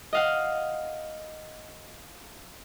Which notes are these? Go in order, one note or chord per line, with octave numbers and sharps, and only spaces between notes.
D#5 F5 F#5